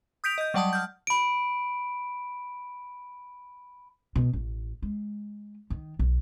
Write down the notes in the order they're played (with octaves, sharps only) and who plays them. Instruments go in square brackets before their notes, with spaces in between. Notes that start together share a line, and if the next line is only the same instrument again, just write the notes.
[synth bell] D#6 G6 B6 D7 F7
D#5 G6
F#3 G3 D5 F#5 A5 D#6
F6 G6
[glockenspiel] B5 D7
[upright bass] B2
A1
G#3
D#3
B1